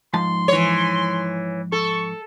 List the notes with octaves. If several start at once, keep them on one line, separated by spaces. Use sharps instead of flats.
G#2 F3 A5 C6
E3 C#5
A4 C#6